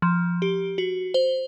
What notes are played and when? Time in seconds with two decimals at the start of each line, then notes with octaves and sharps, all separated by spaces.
0.02 F3
0.42 G4
0.78 F#4
1.14 C5